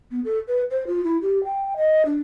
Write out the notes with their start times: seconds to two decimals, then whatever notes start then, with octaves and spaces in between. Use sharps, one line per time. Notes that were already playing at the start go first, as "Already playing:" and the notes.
0.11 B3
0.25 A4
0.48 B4
0.71 C5
0.87 F4
1.04 E4
1.22 G4
1.44 G5
1.77 D#5
2.06 D4